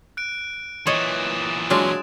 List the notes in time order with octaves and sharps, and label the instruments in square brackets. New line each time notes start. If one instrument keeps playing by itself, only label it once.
[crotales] F#6 D7
[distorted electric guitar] A#2 E3 [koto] C#5 D#5 [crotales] D#6 A6 E7
[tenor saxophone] F#3 [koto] G#3 D4 F4